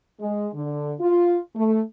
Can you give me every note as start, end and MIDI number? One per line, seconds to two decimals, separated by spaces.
0.20 0.48 56
0.55 0.94 50
1.00 1.39 65
1.55 1.81 57